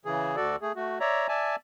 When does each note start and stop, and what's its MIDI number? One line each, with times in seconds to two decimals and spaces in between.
0.05 0.36 49
0.05 0.36 52
0.05 0.36 68
0.36 0.56 38
0.36 0.56 66
0.36 0.56 69
0.36 0.56 74
0.62 0.72 57
0.62 0.72 68
0.76 0.99 57
0.76 0.99 66
1.00 1.27 73
1.00 1.27 74
1.00 1.27 76
1.00 1.27 82
1.28 1.56 74
1.28 1.56 76
1.28 1.56 80
1.28 1.56 81